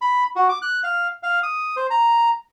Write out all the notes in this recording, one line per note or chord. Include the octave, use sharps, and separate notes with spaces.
B5
F#4
D6
F#6
F5
F5
D#6
C5
A#5